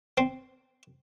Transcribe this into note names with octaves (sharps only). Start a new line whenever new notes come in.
C4